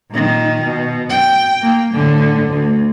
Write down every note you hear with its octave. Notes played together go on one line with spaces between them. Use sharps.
A#2 D#3
B2
G5
A#3
A2 D3
D2